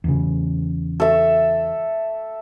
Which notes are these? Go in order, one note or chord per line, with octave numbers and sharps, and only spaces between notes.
E2 C#3
A4 E5